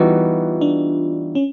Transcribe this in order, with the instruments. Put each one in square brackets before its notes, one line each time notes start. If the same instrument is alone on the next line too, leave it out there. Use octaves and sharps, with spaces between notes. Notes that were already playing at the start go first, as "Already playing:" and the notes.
Already playing: [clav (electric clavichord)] E3 G3 B3 D#4 F#4 [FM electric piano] F4
[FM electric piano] D4
C#4